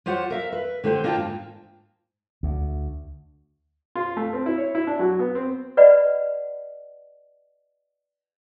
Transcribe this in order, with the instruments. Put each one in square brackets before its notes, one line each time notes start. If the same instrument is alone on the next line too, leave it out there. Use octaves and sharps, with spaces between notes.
[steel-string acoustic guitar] F4 G4 C5 C#5 F#5
A#4 E5 F5
B4
D3 A3 G4 C5
A#3 D4 F4 D5 G5 A5
G#2
[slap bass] D2
[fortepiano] F4
A3
C4
E4
C#5
E4
D4
F#3
B3
C4
[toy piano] B4 D5 D#5 F#5 B5